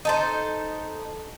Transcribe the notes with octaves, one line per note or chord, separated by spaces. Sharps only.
D#4 A4 C5